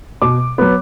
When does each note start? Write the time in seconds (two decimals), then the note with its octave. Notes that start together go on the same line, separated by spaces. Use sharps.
0.22 B2 D6
0.58 F#3 B3